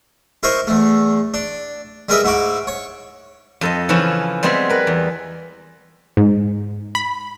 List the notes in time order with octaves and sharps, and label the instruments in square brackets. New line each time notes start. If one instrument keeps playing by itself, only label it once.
[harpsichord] E4 A#4 C5 C#5 D#5
E2 A3
D4
G3 G#3 A#4 B4 D#5 E5
G#2 E4 F#4 D6
C#5
[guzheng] F2 A4 D#5
C#3 E3 F3 C#4 E4
G3 G#3 B3 C4 G#4
A#4 B4 B5
E2
[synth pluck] G#2
B5